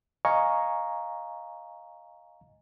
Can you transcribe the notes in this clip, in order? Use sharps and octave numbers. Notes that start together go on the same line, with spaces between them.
D#5 F5 G#5 A#5 C#6